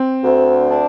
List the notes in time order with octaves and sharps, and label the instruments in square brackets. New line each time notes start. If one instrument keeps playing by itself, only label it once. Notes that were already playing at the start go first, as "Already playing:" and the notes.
Already playing: [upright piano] C4
[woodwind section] D2
D4